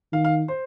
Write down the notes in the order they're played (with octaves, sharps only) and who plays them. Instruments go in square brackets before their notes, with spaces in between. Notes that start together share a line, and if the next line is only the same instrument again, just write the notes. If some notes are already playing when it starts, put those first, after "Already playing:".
[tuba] D#3 [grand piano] F5
[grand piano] F5
C5